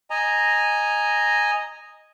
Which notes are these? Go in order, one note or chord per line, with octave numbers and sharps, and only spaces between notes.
D#5 G#5 A#5